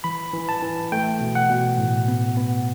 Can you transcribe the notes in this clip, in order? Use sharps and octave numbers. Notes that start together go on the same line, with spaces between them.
E3 B5
E3
A5
E3
A3 G5
B2
F#5
B2
A2
B3
B3